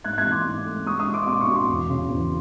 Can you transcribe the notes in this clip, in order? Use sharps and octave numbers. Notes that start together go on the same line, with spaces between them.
G#2 F#6 G#6
F#6 G#6
E3
C6 D6
G#2
A3
G#3 C#6 D#6
C#6 D#6
G#3
C6 D6
B2 C6 D6
C#6 D#6
B2
C6 D6
E2
C#3
E2